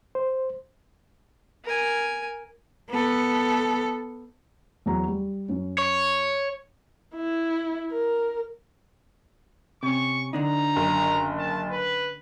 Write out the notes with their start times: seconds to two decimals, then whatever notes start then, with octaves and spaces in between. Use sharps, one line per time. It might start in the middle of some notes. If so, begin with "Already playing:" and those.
0.15 C5
1.64 A#4 G#5
2.89 B3 A4
4.86 E2 F#3 A#5
5.08 G3
5.48 F#2 C#4
5.78 C#5
7.15 E4
7.91 A#4
9.83 C3 C#4 C#6
10.33 D3 D4 D#4 A#5
10.76 F#1
11.38 A5
11.71 B4